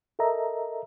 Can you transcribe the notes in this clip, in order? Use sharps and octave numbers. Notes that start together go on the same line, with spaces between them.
A4 A#4 D#5 E5 A#5